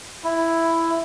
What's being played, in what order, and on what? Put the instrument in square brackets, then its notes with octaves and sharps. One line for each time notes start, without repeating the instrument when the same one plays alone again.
[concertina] E4